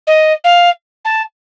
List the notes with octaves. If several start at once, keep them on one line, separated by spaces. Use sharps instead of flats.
D#5
F5
A5